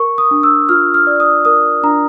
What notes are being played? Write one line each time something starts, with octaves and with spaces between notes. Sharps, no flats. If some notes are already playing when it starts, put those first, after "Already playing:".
Already playing: A#4 C#6
D#6
D4
E6
F4 F6
F6
D5
D#6
A#4 D#6
D4 A#5